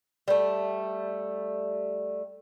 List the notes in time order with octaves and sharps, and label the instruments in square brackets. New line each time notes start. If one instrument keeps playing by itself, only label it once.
[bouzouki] G3 A3